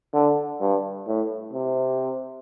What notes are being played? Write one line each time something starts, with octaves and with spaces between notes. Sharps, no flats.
D3
G2
A2
C3